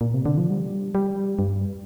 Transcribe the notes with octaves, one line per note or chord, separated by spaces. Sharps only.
A#2
C3
D3
F3
G3
G3
G2